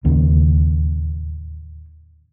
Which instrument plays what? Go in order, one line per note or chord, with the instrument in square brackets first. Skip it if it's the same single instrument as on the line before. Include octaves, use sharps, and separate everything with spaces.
[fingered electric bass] D1 D#2 C#3 A#3